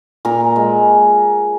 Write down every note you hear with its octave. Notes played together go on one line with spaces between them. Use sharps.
A#2 A#4
G#3